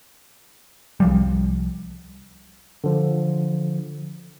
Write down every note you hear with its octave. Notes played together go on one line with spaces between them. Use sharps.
C2 F3 G3
D3 F3